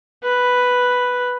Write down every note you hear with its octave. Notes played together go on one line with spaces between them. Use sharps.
B4